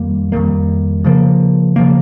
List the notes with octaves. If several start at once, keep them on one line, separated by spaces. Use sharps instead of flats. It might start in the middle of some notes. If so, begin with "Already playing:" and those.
Already playing: F2 D#3 G3 A#3
F2 D#3 G3 A#3
C#3 F3 A#3
C#3 F3 A#3